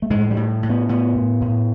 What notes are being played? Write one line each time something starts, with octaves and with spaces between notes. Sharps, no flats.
A3
A2 G#3
G3
A2
A2
B3
A2 B3
A2
A2